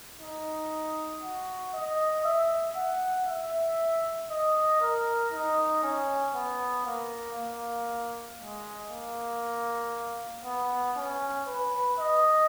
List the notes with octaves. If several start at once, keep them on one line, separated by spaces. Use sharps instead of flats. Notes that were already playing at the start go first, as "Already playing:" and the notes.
D#4
F#4
D#5
E5
F#5
E5
D#5
A#4
D#4
C#4
B3
A#3
A#3
G#3
A#3
B3
C#4
B4
D#5